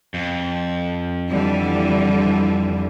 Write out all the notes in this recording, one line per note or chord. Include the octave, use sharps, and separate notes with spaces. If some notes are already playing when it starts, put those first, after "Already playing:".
F2
D3 E3 G3